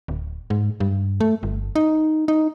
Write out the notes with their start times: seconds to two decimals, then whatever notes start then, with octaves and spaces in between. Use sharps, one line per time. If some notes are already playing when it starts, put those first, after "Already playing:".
0.08 D1
0.50 G#2
0.80 G2
1.20 A3
1.43 G1
1.76 D#4
2.28 D#4